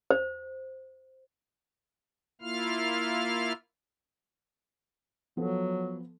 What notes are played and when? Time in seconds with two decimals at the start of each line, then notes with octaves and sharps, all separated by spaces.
0.11 C5
2.41 A#3 E4 F4 F5 F6
5.37 F3 F#3 B3 A4